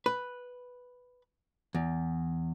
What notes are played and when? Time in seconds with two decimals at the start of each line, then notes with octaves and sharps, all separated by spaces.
0.06 B4
1.75 E2